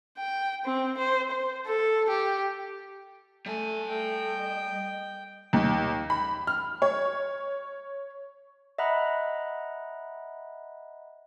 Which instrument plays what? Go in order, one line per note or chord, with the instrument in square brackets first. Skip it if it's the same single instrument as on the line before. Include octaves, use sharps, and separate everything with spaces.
[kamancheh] G5
C4
C5
C5
A4
G4
[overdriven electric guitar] G3 G#5 [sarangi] A3
[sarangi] A3 [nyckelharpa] G5
[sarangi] D#5
[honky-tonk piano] D#2
B5
F6
C#5
[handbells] D#5 E5 F#5 A#5 B5 F#6